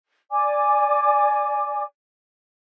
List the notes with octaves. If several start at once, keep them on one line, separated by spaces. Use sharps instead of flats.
D5 G#5 D6